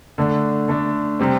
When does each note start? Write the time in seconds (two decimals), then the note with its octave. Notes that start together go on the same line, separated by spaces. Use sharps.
0.18 D3 A3 D4
0.68 D3 A3 D4
1.19 C3 G3 C4